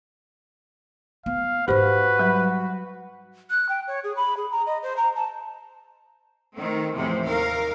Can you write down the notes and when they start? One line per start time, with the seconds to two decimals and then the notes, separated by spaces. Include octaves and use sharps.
1.26 B3 F5
1.68 G#2 D#4 F#4 G4 B4 C5
2.19 F#3 G3
3.50 F#6
3.69 G5
3.87 C#5
4.04 G#4
4.17 B5
4.37 G#4
4.52 A#5
4.66 D#5
4.83 C5
4.97 A#5
5.16 A5
6.56 D#3 A3 C4
6.94 E2 A2 C3 E3 F3
7.24 D#2 A#4 F5